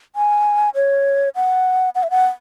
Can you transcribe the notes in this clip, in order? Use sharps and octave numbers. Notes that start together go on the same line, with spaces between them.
G#5
C#5
F#5
F#5
E5
F#5